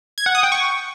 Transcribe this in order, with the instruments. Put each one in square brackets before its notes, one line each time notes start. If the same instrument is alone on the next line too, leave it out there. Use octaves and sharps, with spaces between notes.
[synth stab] G#6
F#5
D#6
G5
C#6